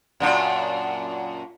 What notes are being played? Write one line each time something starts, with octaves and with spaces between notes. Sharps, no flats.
F#2 A#2 D4